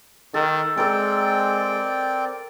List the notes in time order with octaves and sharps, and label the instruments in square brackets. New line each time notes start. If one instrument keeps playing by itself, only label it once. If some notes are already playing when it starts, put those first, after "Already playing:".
[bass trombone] D#3 [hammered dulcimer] A4
[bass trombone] G#3 [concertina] C4 D5 G5 [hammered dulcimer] A4 A#4